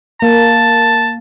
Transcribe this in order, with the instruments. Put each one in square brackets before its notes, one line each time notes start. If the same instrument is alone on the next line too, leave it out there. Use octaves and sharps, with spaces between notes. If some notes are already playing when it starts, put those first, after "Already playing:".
[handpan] A#3 [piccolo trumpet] A5